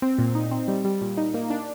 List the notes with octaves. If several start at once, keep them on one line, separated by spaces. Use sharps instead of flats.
C4
A#2
D#4
C4
G3
G3
A#2
D#4
A#3
D4